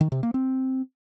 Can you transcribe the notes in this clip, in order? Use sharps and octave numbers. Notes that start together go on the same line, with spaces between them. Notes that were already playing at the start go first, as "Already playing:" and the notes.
D#3
C3
A#3
C4